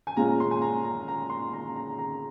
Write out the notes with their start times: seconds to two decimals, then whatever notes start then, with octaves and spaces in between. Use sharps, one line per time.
0.07 G#5
0.17 A#2 G#3 C#4 F4 A#5
0.40 C6
0.51 G#5
0.62 A#5
0.84 A#5
1.08 A#5
1.30 C6
1.53 A#5
1.76 A#5
1.99 A#5